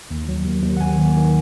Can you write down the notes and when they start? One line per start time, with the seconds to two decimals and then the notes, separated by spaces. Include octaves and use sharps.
0.11 D#2
0.28 F#3
0.46 D#2
0.63 D#2
0.77 F#5
0.81 D#2 G#5
0.98 D#3
1.17 D#3